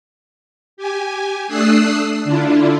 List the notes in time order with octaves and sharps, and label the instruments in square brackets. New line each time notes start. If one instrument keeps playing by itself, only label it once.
[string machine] G4 G#5
A3 D4 D#6 E6 F#6 C7
D3 D4 E4 F4